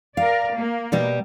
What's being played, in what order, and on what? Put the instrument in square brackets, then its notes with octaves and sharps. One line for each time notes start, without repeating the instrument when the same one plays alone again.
[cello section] A#4 D5 [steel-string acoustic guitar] F5
[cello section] A#3
[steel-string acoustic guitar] B2 G3 G4